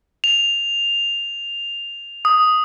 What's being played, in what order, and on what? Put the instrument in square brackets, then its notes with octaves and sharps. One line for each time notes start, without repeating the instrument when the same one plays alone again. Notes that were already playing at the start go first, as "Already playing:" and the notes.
[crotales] F7
D#6